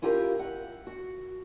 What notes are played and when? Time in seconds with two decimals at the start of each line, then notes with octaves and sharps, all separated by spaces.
0.02 C#4 E4 F4 G4 A4 A#4
0.39 F#5
0.87 F#4